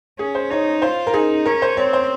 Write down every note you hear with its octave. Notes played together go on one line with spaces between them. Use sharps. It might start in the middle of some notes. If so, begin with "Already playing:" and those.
C#4 G#4
C5
D#4 C#5
F4 C5
A#4
D#4 G#4
C#4 A#4
C5
C4 C#5
C5